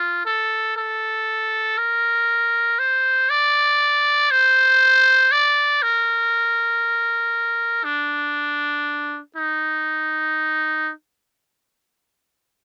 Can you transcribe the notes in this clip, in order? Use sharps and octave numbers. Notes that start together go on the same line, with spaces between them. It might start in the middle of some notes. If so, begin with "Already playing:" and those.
Already playing: F4
A4
A4
A#4
C5
D5
C5
D5
A#4
D4
D#4